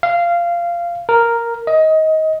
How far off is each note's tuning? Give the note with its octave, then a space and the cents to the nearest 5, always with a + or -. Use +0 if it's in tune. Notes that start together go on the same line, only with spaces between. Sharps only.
F5 -15
A#4 +0
D#5 +20